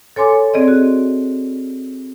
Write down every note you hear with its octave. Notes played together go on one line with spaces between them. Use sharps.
A4 C#5 G#5 C6 D6
C4 G#4 D5 D#5
F#4